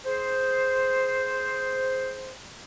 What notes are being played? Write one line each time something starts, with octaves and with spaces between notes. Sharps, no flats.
G#4 C5